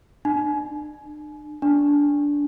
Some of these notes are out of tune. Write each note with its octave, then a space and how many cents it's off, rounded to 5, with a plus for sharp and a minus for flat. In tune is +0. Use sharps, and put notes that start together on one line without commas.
D4 +40
D4 -15